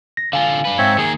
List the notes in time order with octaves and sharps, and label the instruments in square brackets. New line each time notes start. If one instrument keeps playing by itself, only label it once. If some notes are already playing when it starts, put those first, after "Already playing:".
[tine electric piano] A#6
[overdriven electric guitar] D3 F4 [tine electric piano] F5 G#5
[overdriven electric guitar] D4 B4
[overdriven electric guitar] G#2 [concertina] C4 C#5 E5
[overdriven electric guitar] D#3 A#3 [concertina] G#4